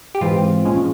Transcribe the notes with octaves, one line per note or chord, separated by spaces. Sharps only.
G4
G#2 E3 G#3 C4 F4
A#2 F3 G#3 C#4